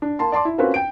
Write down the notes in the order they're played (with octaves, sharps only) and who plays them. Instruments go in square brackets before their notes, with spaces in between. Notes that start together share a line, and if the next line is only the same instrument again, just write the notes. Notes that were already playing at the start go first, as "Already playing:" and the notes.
[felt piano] D4
A#3 A5 C6
D5 A5 C6 D6
E4
A#3 C4 C#4 F4 F#4 B4
G5 D7